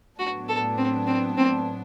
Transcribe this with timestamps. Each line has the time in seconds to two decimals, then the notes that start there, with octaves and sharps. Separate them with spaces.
0.19 A2 F#3 B3 D4 F#4
0.49 A4
0.77 C4
1.07 C4
1.37 C4